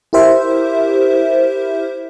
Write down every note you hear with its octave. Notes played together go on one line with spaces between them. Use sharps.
E4 G4 A#4 C5 E5